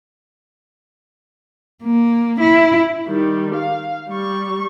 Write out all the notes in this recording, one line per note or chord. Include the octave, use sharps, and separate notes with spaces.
A#3
E4
D#3 G3
F5
G3 C#6